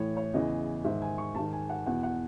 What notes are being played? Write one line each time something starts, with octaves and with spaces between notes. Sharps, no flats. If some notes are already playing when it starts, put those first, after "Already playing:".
Already playing: A2 E3 C#5
C#5
E2 C#3 E3 D#5
G#2 D#3 E5
G#5
C#6
G#2 D#3 A5
G#5
F#5
E2 B2 F#5
F#5